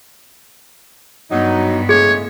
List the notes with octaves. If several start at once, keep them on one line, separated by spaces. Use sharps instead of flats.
G2 F#3 B3 D#4
A2 C#3 G#3 G#4 C#5